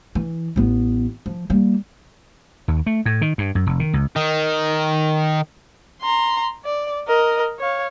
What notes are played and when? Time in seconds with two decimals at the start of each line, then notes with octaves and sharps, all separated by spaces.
0.15 E3
0.56 A1 B3
1.26 F3
1.50 G3 A#3
2.68 D#2
2.86 A3
3.06 A2
3.22 D#3
3.38 G2
3.55 F#2
3.67 F1
3.80 D#3
3.93 C#2
4.16 D#3
6.02 A#5 C6
6.65 D5
7.08 A#4 D#5
7.59 C#5 F5